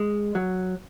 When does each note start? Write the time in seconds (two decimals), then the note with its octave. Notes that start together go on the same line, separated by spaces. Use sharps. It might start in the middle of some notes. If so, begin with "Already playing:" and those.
Already playing: G#3
0.35 F#3